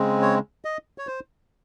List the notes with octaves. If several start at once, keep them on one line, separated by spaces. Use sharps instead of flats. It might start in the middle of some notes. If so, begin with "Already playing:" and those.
Already playing: C#3 G#3 C4
C#5
D#5
C#5
C5